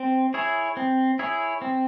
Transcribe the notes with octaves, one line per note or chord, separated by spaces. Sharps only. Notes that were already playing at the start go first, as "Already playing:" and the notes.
Already playing: C4
E4 G#4 C#5
C4
E4 G#4 C#5
C4